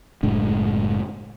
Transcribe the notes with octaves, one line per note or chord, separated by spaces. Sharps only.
F#1 A2 G#3 D4